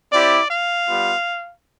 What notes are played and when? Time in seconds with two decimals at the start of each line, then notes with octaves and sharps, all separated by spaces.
0.12 C4 E4 G4 D5
0.50 F5
0.87 G3 B3 F4